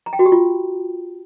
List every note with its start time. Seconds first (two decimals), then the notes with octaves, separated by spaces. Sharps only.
0.06 A#5
0.13 G5
0.19 F#4
0.26 G4
0.32 F4